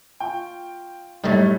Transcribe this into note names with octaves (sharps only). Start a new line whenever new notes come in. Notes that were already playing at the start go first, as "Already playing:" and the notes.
F4 G5 C#6
F#2 A2 G3 A3 D#4